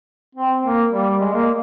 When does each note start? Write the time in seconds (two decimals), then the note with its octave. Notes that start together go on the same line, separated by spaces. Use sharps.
0.35 C4
0.64 A#3
0.91 G3
1.21 G#3
1.34 A#3